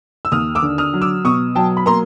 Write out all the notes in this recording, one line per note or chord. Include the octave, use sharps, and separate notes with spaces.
E6
D#2 D#6 F6
D6 E6
D3
D#6 F6
F#3
D6 E6
B2 C#6 D#6
F#3 G5 A5
B5
A#3 A#5 C6